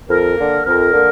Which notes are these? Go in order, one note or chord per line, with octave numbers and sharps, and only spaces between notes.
F2 A#4
D3 A#3
F2 A#4
D3 A#3